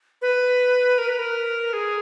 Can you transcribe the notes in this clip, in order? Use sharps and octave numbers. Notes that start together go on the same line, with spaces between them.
B4
A#4
B4
A#4
G#4